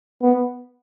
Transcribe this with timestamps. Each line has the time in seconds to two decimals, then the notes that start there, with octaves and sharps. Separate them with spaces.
0.22 B3